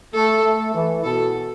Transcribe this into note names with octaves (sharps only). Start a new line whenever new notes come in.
A3 A4
A3
E3
B2 A4